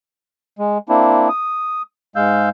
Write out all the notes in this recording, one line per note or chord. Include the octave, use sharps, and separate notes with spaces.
G#3
A#3 C4 D4 E4
D#6
G#2 G#3 F5 E6 G6